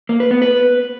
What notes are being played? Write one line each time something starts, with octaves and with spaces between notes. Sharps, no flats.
A#3
B4
B3
B4